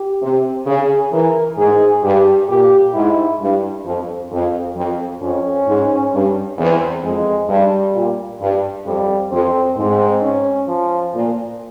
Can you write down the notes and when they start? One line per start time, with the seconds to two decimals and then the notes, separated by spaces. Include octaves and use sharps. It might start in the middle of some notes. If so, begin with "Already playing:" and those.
Already playing: G4
0.22 C3
0.66 C#3 G#4
1.12 E3 A#4
1.57 G#2 G#4
2.03 G2 G4
2.49 A#2 G4
2.94 G#2 E4
3.40 G2
3.85 F2
4.31 F2
4.76 F2
5.22 F2 C#4
5.67 G#2
6.13 G2
6.58 E2 C4
7.04 F2 G#3
7.49 G2 G3
7.94 A#2
8.41 G2
8.86 F2 G3
9.32 F2 C4
9.77 G#2 C4
10.22 C#4
10.68 F3
11.14 A#2